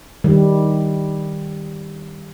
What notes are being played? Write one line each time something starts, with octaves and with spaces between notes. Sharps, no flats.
D#3 G3